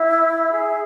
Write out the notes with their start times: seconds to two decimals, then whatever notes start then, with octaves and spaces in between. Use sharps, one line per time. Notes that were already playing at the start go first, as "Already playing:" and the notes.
Already playing: E4
0.51 G#4